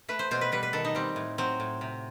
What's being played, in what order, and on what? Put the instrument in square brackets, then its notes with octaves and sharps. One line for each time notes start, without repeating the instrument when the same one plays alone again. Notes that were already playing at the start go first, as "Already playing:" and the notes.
[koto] A3 B4
C5
B2 C5
B4
G3 B4
B4
D#3 A4
D#4
G3 C4
A2
F#3 C4
A2
C3